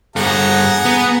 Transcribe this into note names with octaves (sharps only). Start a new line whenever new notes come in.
G2 G#4 A4 F#5 A#5
B3